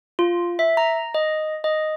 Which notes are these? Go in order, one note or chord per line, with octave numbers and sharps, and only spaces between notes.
F4
E5
A#5
D#5
D#5